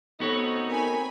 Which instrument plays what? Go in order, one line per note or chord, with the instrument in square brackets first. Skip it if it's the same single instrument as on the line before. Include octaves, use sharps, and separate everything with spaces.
[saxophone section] A3 D#4 [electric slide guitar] B3 F#4 C#5 [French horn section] C4 A4
[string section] C4 G#5 B5 [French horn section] A#4